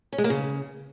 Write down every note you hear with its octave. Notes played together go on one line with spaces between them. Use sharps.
C#4
G#3
A#3
C#3